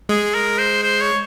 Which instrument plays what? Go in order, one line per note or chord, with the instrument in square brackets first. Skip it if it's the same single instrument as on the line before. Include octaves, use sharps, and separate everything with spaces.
[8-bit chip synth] G#3 [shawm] G#4
[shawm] A#4
C5
C5
C#5